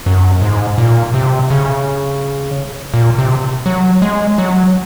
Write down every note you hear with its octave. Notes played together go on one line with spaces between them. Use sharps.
F#2
G#2
A#2
C3
C#3
A#2
C3
F#3
G#3
F#3